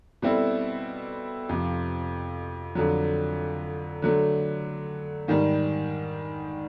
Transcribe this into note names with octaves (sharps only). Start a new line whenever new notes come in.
B2 G3 C4 E4 A4
F2 C3 F3
F2 D3 F#3
D3 F#3 A3
G#2 D#3 G3